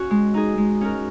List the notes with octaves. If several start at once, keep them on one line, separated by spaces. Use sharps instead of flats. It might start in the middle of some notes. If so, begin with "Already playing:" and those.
Already playing: C#4 F#4
G#3
D#4 G#4
G#3
C#4 F#4 A#4